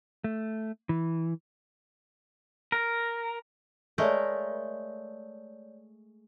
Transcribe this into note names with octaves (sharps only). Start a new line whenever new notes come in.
A3
E3
A#4
G#3 A3 A#4 C#5 D5 G6